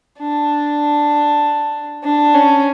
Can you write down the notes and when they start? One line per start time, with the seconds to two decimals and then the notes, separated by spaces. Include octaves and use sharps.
0.19 D4
2.04 D4
2.35 C#4